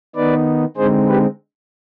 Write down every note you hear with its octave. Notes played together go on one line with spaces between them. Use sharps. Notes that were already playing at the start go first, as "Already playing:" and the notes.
D#3 B3 D#4 B4 D5
D3 G#3 C4 D#4 G#4 C5
G4 B4